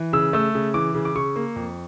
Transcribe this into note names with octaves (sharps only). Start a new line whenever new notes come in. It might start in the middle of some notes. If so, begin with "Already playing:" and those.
Already playing: E3
C#3 E6
A3 E6
C#3
E3 D6
C#3
D6
C#3 C#6
A#3
F2